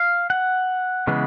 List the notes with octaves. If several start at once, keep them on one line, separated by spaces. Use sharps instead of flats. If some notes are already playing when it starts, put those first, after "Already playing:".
Already playing: F5
F#5
C#3 E3 G#3 B3